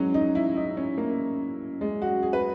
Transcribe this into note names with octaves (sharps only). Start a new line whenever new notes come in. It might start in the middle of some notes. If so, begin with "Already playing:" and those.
Already playing: E3 F#3 G#3 C#4
D#4
E4
D#4
C#4
A#3
G#3
F#4
G#4
B4